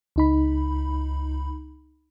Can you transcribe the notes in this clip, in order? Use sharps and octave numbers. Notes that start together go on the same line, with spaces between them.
C#2 D#4 B5